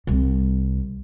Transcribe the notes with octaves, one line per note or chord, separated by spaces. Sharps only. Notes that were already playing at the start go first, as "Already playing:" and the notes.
C2 C3